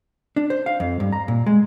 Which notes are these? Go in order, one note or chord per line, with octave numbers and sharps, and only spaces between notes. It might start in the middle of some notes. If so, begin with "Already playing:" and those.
D4
C5
F5
F2
G2
A#5
A#2
G#3